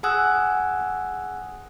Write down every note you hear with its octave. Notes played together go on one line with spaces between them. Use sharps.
G#4 F#5 G#5 D#6 E6 F#6